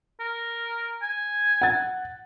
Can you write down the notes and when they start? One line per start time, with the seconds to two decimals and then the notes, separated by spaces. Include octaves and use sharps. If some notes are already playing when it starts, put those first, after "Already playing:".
0.20 A#4
1.03 G#5
1.61 F#5 A6